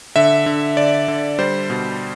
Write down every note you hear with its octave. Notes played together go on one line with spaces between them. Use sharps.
D3 E5
D3
D3 D5
D3
G3 C5
B2